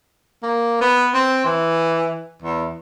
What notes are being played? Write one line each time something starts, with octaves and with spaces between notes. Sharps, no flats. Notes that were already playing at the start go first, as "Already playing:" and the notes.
A#3
B3
C4
E3
E2